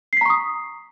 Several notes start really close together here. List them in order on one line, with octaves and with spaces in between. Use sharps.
C7 B6 A#5 C#6 D#6